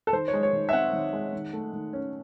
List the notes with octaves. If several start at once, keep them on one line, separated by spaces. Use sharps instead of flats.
A4
D#3 C5
C#5
G#3
C#5
D#3
E5
C4 F#5
D#3
G#3
D#3
A3
D#3
C#4